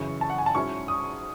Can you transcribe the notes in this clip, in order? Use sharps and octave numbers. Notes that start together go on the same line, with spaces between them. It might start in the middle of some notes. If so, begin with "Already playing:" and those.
Already playing: F#2 C#3 E3 C#6
A5
F#5
G#5
A5
G#2 F#3 C#4 E4 C#6
D#6